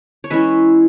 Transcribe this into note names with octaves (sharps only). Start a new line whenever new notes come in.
C#5
E3 G#3 C#4 E4 B4 E5